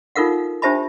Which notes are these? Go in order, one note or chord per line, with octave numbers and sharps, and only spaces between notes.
D#4 F4 A4 A#4 F5 F#5
D4 G4 C5 E5 A5 B5